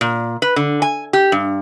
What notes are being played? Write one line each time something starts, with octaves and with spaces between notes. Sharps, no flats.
A#2
B4
D3
G#5
G4
G2